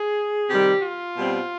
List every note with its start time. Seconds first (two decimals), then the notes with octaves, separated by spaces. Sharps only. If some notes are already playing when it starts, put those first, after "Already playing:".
Already playing: G#4
0.50 C3 D#3 G3 G4
0.83 F4
1.16 B2 G3 C4